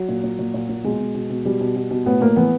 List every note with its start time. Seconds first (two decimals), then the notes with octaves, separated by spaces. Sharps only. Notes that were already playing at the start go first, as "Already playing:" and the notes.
Already playing: F#3
0.09 A#2
0.24 A#2
0.39 A#2
0.54 A#2
0.69 A#2
0.84 B2 G#3
1.00 B2
1.15 B2
1.30 B2
1.45 B2 G3
1.61 B2
1.76 B2
1.91 B2
2.06 A2 B3
2.21 A2 A#3
2.36 E3 B3